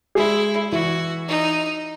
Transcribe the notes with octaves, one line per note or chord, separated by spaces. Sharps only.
G#3 E4 G#4
E3 E4 F#4
D#4